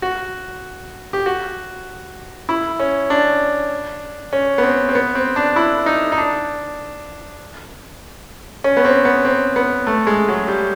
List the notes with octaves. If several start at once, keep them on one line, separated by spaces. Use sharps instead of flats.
F#4
G4
F#4
E4
C#4
D4
C#4
B3
C4
C4
B3
C4
D4
E4
D#4
D#4
D4
C#4
B3
C4
B3
C4
B3
A3
G#3
F#3
G3